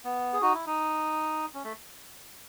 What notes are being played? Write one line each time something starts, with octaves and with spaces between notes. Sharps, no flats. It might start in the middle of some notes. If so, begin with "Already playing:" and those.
B3
G#4
D#4 F#4
E4
D#4
C#4
A3